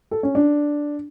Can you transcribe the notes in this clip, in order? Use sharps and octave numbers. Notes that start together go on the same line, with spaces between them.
A4
C#4
D4